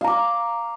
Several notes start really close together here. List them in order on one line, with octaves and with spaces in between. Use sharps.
F5 A#5 D6